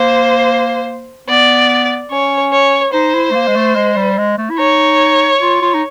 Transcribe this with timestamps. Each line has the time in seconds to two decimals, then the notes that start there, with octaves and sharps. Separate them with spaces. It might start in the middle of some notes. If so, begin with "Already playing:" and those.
Already playing: A#3 C5
1.28 B3 D5
2.11 C#4 C#5
2.53 C#5
2.93 D#4 C5
3.15 E4
3.31 A3
3.35 A#3
3.47 G#3
3.56 A3
3.76 G#3
3.97 G3
4.18 G#3
4.38 A3
4.50 E4
4.58 D#4 C#5
5.42 F4
5.62 F4
5.74 D#4